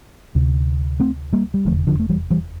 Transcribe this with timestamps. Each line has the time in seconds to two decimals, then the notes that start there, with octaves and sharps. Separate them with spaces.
0.35 D2 C3
1.00 A3 C4
1.33 G3 A#3
1.54 G3
1.65 F1 E2 D3 F3 A3
1.87 D3 F3
2.00 A3
2.09 E3 G3
2.30 E3 G3